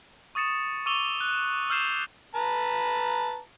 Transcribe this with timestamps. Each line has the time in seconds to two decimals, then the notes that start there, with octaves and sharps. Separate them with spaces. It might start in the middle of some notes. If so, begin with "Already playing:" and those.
0.35 C#6 D#6 A6 C#7 E7
0.86 C#6 D6 E6 D#7 F7 G7
1.21 F#6
1.70 E6 F6 G6 C7 E7 F7
2.35 B4 A5 A#5